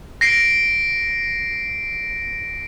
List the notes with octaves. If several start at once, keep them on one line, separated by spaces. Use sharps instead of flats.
A#6 C7 D7